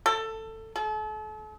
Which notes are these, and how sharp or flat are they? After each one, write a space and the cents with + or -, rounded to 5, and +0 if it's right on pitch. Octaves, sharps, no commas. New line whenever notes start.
A4 +15
A4 -40